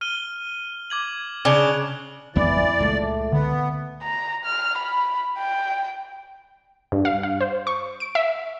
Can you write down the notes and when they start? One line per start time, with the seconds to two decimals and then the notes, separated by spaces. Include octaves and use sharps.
0.01 F6 D#7 G7
0.90 D6 G#6 F#7
1.45 C#3 D4 D7 F7 G7
2.36 G#1 F2 E3 B3 D5
2.80 C#2 A#2 C#3 A3
3.33 D3 B3
4.03 A#5
4.45 F6
4.78 B5
5.38 G5
6.92 G2
7.05 F5
7.23 F5
7.41 C5
7.67 C#6
8.00 D7
8.15 E5